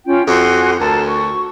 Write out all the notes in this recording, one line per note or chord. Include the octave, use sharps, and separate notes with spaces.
C#4 F4 G5
F2 F#4 G#5 C6
D2 A4 A#4 A5
C#6